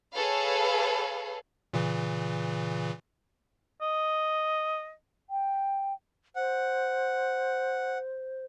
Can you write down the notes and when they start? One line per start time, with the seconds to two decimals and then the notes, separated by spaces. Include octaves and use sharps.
0.13 G#4 A4 B4 C#5 F5
1.74 A#2 C#3 E3
3.82 D#5
5.30 G5
6.36 C5 F#5